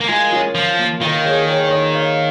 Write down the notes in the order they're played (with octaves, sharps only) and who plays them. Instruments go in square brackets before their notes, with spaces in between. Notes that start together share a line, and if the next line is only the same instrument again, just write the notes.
[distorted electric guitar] A#3
[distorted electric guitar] G#3 [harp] F4 A#4
[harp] C#4 F4
[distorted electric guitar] F3
[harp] A#3
[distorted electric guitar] D#3 [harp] F4 A#4
[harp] G#4 C#5
G#4 C#5
C#5
A#4 D#5
C#5 F5